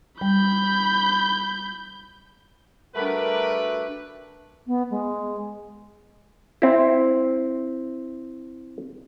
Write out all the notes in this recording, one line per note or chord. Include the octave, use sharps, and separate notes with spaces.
G3 B5 G6
G3 A3 D4 F#4 A#4 B4
B3
G#3
C4 E4